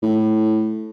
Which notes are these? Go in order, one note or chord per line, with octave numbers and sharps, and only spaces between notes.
A2